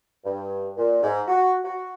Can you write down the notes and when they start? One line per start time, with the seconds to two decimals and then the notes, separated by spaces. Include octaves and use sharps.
0.24 G2
0.77 A#2
1.02 G#2
1.28 F#4
1.64 F#4